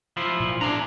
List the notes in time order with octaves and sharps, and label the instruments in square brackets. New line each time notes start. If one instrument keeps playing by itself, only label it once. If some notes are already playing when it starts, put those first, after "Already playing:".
[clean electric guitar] F3 E4 F4
[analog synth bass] A#2
[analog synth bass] D4 [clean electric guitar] G#4 D5 A#5